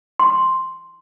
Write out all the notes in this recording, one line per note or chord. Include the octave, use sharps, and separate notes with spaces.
C6